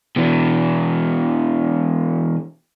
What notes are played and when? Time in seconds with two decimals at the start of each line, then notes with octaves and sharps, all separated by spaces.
0.16 B2 E3